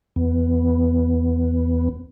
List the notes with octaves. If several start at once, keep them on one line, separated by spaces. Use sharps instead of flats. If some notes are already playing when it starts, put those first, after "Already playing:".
E2 B3